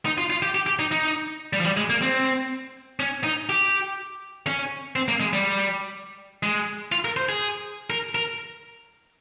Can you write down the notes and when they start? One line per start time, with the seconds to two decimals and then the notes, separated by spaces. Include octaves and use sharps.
0.05 D#4
0.18 F4
0.30 F4
0.42 G4
0.55 G4
0.67 G4
0.79 D#4
0.92 D#4
1.53 G3
1.60 F3
1.65 G3
1.77 G#3
1.90 A#3
2.02 C4
3.00 C#4
3.24 D#4
3.49 G4
4.47 C#4
4.96 C4
5.08 A#3
5.21 G#3
5.33 G3
6.43 G#3
6.92 F4
7.05 A#4
7.17 C5
7.29 G#4
7.90 A#4
8.15 A#4